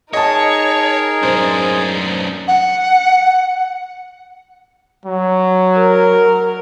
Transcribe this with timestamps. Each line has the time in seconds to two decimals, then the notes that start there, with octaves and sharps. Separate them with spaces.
0.13 D#4 G#4 A#4 C#5 D#5 A5
1.23 F#2 D4 C5
2.47 F#5
5.05 F#3
5.79 A#4